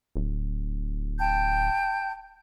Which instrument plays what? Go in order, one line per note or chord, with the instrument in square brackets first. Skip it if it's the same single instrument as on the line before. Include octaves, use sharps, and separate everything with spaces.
[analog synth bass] D1
[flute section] G5 A5 G6